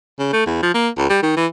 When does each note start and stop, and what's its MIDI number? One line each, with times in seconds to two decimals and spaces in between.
0.19 0.29 49
0.33 0.44 57
0.46 0.62 40
0.63 0.70 53
0.74 0.89 58
0.97 1.09 37
1.10 1.19 55
1.23 1.34 51
1.37 1.46 52